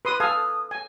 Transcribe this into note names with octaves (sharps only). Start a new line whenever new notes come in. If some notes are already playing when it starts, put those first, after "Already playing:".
B4 C6 D#6
A4 F5 G#5 D#6
G#5